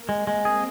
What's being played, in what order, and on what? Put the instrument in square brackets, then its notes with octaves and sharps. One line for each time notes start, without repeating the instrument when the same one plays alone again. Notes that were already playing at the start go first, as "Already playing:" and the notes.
Already playing: [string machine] A#3
[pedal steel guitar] G#3 [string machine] C4
[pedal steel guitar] G#3
G#4